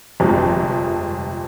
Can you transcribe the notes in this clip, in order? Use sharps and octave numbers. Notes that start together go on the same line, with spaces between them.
G1 F2 C3 F3 G#3